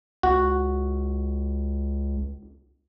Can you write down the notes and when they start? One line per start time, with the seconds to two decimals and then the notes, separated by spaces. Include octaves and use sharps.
0.23 C#2 F#4